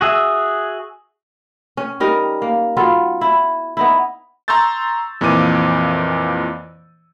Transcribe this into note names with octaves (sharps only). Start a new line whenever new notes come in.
F#4 G#4 E5
C#4
G3 D#4 A#4
A#3
F#3 B3 F4 A4
E4
B3 D#4 E4
A#5 C6 C#6 E6 G6 A6
F2 A#2 E3 D6 D#7